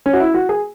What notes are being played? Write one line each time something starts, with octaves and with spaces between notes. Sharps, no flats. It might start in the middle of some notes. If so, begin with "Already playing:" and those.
C#4
F#4
E4
F#4
G#4